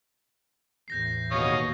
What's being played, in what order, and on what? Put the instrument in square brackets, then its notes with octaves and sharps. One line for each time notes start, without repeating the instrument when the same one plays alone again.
[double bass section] E2 A2 E3 [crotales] G6 A#6 C7
[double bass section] D#2 [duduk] B2 [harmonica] C#5 D#5 F5